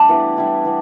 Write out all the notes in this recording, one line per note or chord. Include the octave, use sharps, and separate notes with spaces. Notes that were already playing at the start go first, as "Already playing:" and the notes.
Already playing: G3 A3 D4
E3 B3 G4
G3 E4 G4
E3 B3